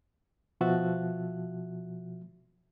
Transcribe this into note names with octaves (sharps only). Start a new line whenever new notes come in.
B2 F3 F#4 E5 F#6 A6